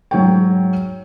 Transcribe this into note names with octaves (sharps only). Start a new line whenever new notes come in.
G#2 F#3 C#5 G5